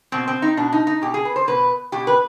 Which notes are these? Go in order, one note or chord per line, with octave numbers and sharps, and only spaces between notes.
B2 C4
C4
D#4
B2 D4
D#4
D#4
B2 G4
G#4
B4
C5
B2 B4
B2 G4
B4